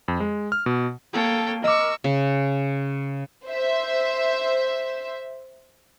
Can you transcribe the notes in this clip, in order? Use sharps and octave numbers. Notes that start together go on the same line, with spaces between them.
F2
G#3
F6
B2
A#3 A4 C#5 G5
A#4 D#5 C#6 D6 E6
C#3
C5 E5